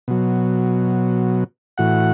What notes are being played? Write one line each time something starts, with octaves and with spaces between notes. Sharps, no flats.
B2 F#3
A2 E3 F#4 F#5